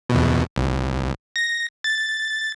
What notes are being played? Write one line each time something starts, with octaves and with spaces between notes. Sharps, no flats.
E2 B2
C2
A#6
A6